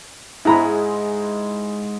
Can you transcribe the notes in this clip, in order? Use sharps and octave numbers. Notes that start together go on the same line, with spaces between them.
G#2 G#3 E4 A#5 B5